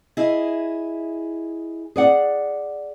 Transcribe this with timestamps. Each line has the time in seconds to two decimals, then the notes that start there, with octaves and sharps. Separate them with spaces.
0.17 E4 G#4 D#5
1.96 G#4 D5 F#5